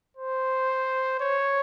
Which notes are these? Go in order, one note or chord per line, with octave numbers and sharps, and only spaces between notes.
C5
C#5